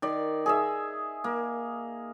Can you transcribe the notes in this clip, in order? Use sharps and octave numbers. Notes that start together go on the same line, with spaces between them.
D#3 D5
G#4 D#5 E5
A#3